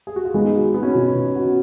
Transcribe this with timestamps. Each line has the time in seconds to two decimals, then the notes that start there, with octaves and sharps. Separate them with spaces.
0.07 G#4
0.16 F#4
0.25 F4
0.34 G#3 B3 D#4
0.55 F#4
0.74 B3 F#4
0.83 C#4
0.91 B2 B3
1.15 B2
1.35 F#4